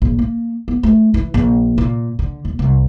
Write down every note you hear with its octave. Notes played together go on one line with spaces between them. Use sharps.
A#1
A#3
B3
A3
E3
A#1
A#2
D3
D#1
C2